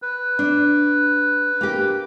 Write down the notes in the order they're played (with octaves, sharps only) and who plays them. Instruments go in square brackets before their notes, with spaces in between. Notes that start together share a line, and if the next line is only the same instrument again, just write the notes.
[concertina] B4
[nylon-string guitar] D4
A#3 G4